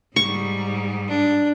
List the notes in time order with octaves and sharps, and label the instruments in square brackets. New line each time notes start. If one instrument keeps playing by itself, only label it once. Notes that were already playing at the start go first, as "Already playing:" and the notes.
[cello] G#2 G3 [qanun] C#6
[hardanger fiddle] D4